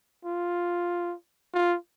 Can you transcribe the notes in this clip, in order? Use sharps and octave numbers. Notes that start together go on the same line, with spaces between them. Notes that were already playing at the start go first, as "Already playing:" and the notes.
F4
F4